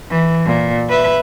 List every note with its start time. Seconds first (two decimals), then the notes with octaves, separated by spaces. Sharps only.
0.10 E3
0.46 A#2
0.89 B4 E5